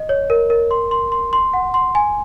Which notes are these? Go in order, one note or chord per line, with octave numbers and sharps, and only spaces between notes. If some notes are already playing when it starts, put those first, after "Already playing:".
Already playing: D#5
C#5
A#4
A#4
C6
C6
C6
C6
F#5
C6
G#5